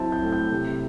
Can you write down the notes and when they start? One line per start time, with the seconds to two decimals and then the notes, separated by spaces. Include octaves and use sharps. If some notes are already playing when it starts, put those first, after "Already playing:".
Already playing: F#3 C4 E4 A5
0.12 G6
0.22 A2
0.32 G6
0.52 C3